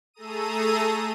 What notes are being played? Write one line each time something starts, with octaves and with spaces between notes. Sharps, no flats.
A3 G#4 A4 A#5 D#6 D#7